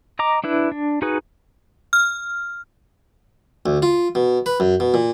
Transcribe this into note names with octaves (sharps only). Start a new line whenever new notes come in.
D#5 A#5 D6
D4 E4 B4
D4
D#4 F#4 G#4 B4
F6
D2
F4
B2
B4
F#2
B2
A#2